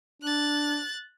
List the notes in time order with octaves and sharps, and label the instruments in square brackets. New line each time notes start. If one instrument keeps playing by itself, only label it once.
[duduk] D4 [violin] F#6 A6